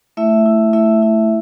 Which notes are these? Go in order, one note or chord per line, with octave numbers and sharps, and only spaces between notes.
A3 E4 E5
E4
A3 E4 E5
E4